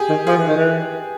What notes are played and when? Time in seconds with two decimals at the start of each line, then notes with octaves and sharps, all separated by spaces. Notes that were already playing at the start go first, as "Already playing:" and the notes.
Already playing: G4 G#4
0.09 D#3
0.27 F3 G#4
0.37 E3
0.47 D#3
0.57 E3